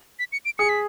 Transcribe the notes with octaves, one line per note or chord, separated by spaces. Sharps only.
B6
C#7
D7
G#4 C#7
B6